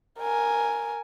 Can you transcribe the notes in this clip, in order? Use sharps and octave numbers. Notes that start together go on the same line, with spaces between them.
A#4 G#5